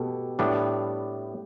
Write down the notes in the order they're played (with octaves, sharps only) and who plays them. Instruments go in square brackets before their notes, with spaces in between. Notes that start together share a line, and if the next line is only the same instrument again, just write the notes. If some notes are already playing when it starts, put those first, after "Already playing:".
Already playing: [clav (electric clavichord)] B2 [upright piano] G4 A4
[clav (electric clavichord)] A2 G3 B3 D4 [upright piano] G4